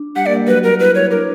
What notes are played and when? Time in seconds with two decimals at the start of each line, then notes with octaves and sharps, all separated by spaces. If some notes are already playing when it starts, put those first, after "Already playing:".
Already playing: D4
0.16 G3 G4 F#5
0.26 A#3 A#4 D5
0.37 G3 G4
0.47 F#3 F#4 B4
0.64 A#4
0.79 E4 B4
0.95 C#5
1.11 D4 A#4